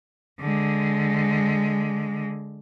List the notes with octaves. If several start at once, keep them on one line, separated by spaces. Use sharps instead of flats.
D3 G#3